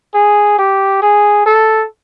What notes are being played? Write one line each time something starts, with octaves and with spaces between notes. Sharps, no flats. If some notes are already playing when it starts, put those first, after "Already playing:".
G#4
G4
G#4
A4